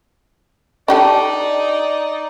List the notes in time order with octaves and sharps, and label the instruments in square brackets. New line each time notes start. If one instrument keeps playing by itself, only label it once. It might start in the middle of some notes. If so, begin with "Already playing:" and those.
[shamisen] D4 G4 A4 [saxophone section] D#4 D5